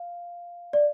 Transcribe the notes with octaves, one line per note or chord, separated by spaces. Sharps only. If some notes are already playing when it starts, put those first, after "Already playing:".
Already playing: F5
D5